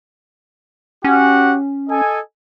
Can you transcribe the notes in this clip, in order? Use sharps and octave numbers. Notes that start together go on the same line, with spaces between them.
C#4 F#4 G4 F#5
A4 D#5 G#5